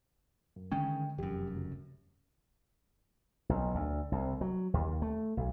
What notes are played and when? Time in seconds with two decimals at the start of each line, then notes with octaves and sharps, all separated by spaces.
0.56 F#2
0.72 D3 D#3 G#3 C#4 G5
1.18 F1 F#2 E3 F3 G4
1.56 C#2 C#3 F#3
3.49 B1
3.75 D2
4.12 C2
4.41 F#3
4.74 D#2
5.02 A3
5.37 B1